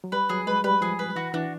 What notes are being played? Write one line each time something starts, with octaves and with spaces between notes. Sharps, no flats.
F#3
G3 B4
F#3 G#4
G#3 B4
G3 B4
F3 G#4
B4
E3 F#4
E3 D4